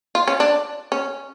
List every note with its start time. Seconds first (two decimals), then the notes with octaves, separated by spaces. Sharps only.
0.15 F4
0.28 C#4
0.40 D4
0.92 C#4